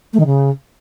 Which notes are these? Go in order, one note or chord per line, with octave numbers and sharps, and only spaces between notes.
A3
D#3
C#3